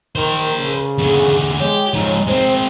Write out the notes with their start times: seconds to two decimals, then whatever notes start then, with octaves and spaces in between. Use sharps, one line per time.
0.16 D#3 A#4 C5
0.58 C#3
0.98 E2 D3 G#4
1.60 G#3 G4 C#5
1.94 G#2 F3 D#4
2.27 G#3 C4 C5